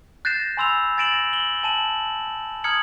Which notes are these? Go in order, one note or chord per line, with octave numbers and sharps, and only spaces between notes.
F#6 G6 A6 A#6 C7 E7
G#5 B5 C6 E6 A6 F7
G#5 A6 A#6 D7 E7 F#7
F#7 G7
G#5 A5 E7 F#7
A#5 D#6 F6 G#6 C#7 F#7